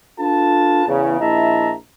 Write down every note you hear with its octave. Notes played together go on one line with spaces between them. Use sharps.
D4 F4 A4 B4 A5
E2 C#3
A#1 E4 D#5 E5 A5 A#5